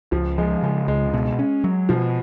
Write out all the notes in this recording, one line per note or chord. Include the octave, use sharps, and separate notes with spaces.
C#2 F3
F3 G#3
C#3 G#3
C#2 G#3
B2
C#4
F#3
B2 F3